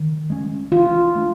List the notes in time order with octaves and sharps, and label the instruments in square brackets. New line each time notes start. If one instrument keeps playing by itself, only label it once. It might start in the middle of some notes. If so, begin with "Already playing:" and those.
Already playing: [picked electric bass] D#3
G#3 C#4
[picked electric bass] E3 [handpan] F4
[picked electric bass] A3 D4